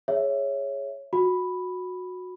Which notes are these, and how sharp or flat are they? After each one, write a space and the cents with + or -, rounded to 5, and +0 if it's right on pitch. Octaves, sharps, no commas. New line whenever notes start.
G#4 +0 C#5 +0 E5 +0
F#4 -20 B5 +0